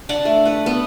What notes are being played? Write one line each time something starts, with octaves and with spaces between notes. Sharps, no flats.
D4 D5 F#5
A3
B4 F#5
B3